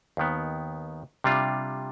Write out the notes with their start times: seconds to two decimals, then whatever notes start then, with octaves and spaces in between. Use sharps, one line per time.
0.17 D#2 D#3 B3
1.24 C3 G3 D4 F4